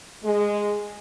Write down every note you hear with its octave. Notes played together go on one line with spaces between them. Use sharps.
G#3